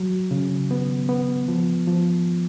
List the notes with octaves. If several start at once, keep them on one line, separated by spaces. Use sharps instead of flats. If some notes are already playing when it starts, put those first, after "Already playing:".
Already playing: F#3
C#3
B3
B3
F3
F3